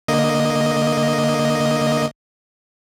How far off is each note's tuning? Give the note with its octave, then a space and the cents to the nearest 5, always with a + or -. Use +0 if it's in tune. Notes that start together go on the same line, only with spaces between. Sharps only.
D3 +10 A#3 +0 D#5 +0